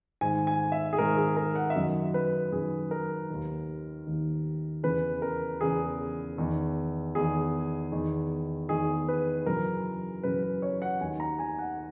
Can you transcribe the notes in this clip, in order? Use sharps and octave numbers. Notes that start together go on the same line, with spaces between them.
G#2 D#3 G#5
G#5
E5
G#4
G#2 D#3 A#4
G#4
A#4
F#5
E5
F#2 D#3 D#5
B4
F#2 D#3 G#4
A#4
D#2 D#3
D#2 D#3
E2 C#3 E3 B4
A#4
E2 C#3 E3 G#4
E2 D#3
E2 D#3 G#4
E2 D#3
E2 D#3 G#4
B4
F#2 C#3 E3 A#4
F#2 C#3 E3 B4
B4
C#5
F#5
D#2 D#3 G#5
A#5
G#5
F#5